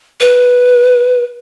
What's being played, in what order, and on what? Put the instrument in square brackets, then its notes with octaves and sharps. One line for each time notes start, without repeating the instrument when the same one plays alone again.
[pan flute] B4